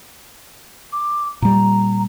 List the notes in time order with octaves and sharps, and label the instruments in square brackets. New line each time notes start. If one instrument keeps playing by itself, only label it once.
[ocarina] D6
[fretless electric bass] A#2 G3 [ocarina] A#5